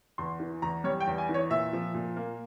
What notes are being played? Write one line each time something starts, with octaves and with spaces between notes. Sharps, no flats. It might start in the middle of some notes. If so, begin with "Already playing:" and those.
E2 C6
E3
E2 A#5
G3 C#5
G5
E2
G#5
E3
C#5
A#2 E5
F3
A#2
A#3